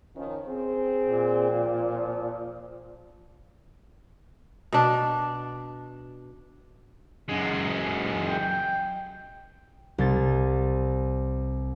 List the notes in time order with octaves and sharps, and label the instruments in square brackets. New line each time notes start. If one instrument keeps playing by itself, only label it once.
[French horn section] D#3 F3 C#4
C4 G#4
[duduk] A#2
[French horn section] F3 F4
[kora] B2 D4
[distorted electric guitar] F#2 G#3
[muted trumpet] G5
[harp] C2 A6